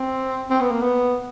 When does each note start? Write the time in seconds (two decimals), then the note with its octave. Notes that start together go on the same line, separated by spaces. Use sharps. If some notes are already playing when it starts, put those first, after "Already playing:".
Already playing: C4
0.50 C4
0.61 B3
0.71 A#3
0.82 B3